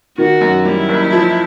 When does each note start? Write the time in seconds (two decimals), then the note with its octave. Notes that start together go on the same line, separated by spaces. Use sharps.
0.18 D#3 F#4
0.41 F#2
0.65 G3 E4
0.89 F#1
1.12 F3